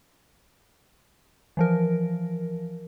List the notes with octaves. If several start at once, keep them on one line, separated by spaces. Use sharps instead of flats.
E3 F3 A#4